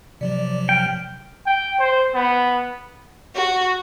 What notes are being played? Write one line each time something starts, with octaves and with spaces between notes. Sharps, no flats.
C3 F3 F#3 D5
G5 F6
G5
C5
B3
F#4